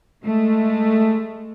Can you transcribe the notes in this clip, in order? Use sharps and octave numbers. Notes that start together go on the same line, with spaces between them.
G#3 A3